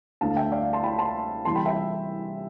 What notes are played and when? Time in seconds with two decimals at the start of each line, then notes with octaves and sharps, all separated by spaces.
0.21 D2 D3 A3 F5 A5
0.37 E5 G5
0.52 D5 F5
0.73 A5 C6
0.83 G5 B5
0.99 A5 C6
1.45 C2 C3 E3 G3 A5 C6
1.55 G5 B5
1.66 E5 G5